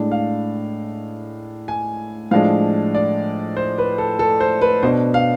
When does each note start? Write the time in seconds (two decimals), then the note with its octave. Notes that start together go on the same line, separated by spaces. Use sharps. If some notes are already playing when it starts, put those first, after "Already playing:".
Already playing: A2 G#3 D4
0.11 F5
1.68 G#5
2.31 A2 F3 G#3 D4 F5
2.95 D5
3.57 C5
3.78 B4
3.98 A4
4.19 A4
4.40 C5
4.61 B4
4.83 B2 B3 D4 C5
5.14 F5